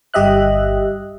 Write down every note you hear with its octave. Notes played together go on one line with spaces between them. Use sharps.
G1 G3 G4 D#5 E5 F#6